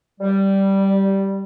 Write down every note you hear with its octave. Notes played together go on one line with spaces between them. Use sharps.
G3